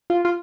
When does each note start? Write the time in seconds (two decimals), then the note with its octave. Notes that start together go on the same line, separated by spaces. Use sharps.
0.10 F4
0.25 F4